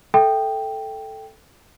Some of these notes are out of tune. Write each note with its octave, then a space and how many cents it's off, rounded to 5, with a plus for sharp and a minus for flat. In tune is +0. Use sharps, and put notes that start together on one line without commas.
A4 +0 E5 +0 G5 +0